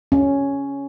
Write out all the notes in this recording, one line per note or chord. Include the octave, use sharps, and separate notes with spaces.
C#4